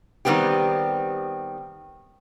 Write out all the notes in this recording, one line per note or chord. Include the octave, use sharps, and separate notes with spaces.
D#3 G3 B3 C4 G4